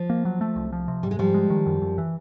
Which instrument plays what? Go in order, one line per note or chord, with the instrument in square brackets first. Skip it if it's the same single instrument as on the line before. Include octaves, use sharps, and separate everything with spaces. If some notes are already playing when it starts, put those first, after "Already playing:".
Already playing: [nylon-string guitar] F3
[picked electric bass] A#3
F#3
A3
C2
F3
C3
[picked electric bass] G#2 [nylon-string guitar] G3
[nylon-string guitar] G#3
[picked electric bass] G#2 [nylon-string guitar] F3 G3
[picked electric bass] G#3
D#3
F#2
F#2
E3